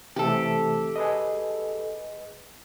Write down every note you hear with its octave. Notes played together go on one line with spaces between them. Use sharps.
C3 E3 A3 G4 A4
G#4 B4 D#5